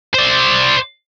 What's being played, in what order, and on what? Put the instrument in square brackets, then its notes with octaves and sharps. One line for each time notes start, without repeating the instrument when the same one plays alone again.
[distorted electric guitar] C5 D5